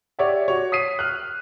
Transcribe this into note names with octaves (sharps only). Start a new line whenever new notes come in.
G4 C#5 D5 E5 F#5
F#4 C#5
D#6 B6 C7 D#7
F6 F#6